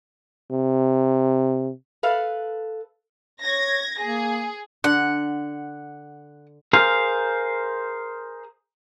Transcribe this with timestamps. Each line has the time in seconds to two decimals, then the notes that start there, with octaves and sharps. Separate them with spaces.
0.52 C3
2.03 A4 B4 F5
3.42 C#5 G#6 A#6
4.01 A#3 G#4
4.84 D3 F#5
6.73 G#4 A#4 C5 F5